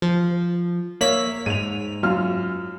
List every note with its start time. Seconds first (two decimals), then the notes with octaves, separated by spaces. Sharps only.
0.02 F3
1.01 A#3 C#5 E5 B6 F#7
1.46 G#2 D#7 F7
2.03 F#2 F4 F6